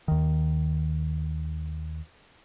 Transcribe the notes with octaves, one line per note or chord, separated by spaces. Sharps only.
D#2 D#3